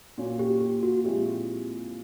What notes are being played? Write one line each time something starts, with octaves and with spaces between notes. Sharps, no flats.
A#2 F#3 A#3 C#4
G4
G4
F#4
A#2 F3 G#3 C4 E4 G4